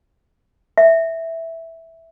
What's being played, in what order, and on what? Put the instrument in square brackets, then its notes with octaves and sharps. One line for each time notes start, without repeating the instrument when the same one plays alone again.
[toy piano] E5